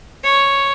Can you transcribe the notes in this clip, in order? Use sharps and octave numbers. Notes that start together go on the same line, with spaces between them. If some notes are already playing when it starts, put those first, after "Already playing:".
C#5